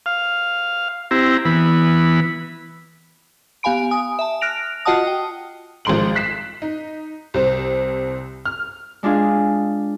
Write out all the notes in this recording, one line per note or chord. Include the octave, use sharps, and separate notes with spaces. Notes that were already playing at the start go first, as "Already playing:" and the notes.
F5
C4 E4 G4 A#5
E3 B3 B5
B3 G4 F5 G#5 B5 D7
G#5 D#6
E5 A5
F6 F#6 A#6 D7 F7
F4 F#4 D#5 F#5 A5 D#6
G5
G#1 F3 G#3 C6 D7 F#7
F#6 B6 C7 E7
D#4
C2 C4 C5
F6
G#3 D4 F4 G#4 F5